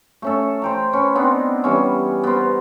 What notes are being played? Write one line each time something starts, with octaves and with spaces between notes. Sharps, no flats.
A3 C#4 A4
C5 G5 A#5
C#4 B4 C#6
B3 C4 D4 D#4
E3 G3 C#4
B3 A#4 C5